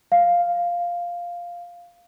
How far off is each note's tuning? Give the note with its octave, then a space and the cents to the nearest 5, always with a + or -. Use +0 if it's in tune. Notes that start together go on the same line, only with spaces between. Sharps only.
F5 +0